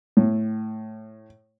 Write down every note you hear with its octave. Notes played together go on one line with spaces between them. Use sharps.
A2